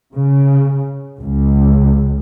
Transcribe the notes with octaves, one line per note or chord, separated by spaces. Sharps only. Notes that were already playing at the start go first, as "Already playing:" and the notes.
C#3
C#2